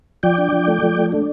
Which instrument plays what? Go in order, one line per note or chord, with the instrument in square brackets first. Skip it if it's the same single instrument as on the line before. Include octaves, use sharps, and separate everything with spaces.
[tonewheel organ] F3 D5 G5
D4
F3
A3
F3
A3
D4